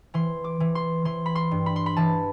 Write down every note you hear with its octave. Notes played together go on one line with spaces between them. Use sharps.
E3 C6
D6
E3
C6
E3 C6
B5
C6
G2
B5
C6
B5
E3 A5